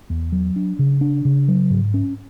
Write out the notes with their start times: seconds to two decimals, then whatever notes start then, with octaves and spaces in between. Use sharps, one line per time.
0.10 E2
0.32 F#3
0.56 D4
0.79 C#3
1.01 D4
1.25 C#3
1.48 F#3
1.70 G#2
1.94 C#4